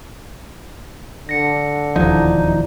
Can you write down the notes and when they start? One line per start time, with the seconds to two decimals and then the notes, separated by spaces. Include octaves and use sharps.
1.29 D3 A#6 C#7
1.96 E1 D#2 F3 D#4 E4 D5